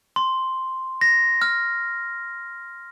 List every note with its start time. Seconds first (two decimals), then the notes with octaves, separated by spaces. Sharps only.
0.16 C6
1.01 A#6
1.42 F6